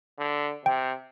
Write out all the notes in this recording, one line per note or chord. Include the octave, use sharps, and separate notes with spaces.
D3
C3 G5